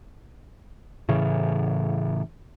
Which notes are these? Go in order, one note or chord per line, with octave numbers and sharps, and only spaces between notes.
A2 C#3 E3